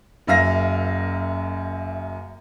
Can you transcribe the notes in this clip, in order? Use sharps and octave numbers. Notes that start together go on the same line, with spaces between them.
F#1 F#2 E5 F5 A#6